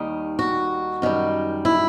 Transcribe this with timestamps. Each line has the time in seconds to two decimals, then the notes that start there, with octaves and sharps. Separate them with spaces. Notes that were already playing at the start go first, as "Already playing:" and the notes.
Already playing: D#2 D#3 G3
0.39 F#4
1.02 F#2 D#3 G3
1.65 E4